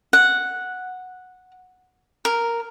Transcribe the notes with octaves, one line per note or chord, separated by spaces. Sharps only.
F#5
A#4